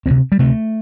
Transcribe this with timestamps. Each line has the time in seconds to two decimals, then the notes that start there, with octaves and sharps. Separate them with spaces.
0.06 D2 C3 C4
0.32 G3
0.39 D2 C3 A3